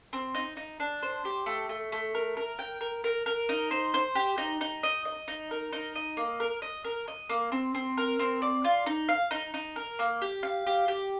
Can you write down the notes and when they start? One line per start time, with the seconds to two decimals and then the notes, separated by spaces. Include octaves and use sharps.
0.13 C4
0.35 D#4
0.57 D#4
0.80 D4
1.03 C5
1.25 G4
1.46 A3
1.69 A3
1.92 A3
2.15 A#4
2.37 A#4
2.59 G5
2.81 A#4
3.04 A#4
3.26 A#4
3.49 D#4
3.71 C5
3.94 C5
4.15 G4
4.38 D#4
4.61 D#4
4.83 D#5
5.05 D#5
5.28 D#4
5.51 A#4
5.73 D#4
5.95 D#5
6.17 A#3
6.40 A#4
6.62 D#5
6.84 A#4
7.08 D#5
7.29 A#3
7.52 C4
7.75 C4
7.98 A#4
8.19 C4
8.42 D5
8.64 F4
8.86 D#4
9.09 F5
9.31 D#4
9.54 D#4
9.76 A#4
9.99 A#3
10.22 G4
10.43 F5
10.67 G4
10.88 G4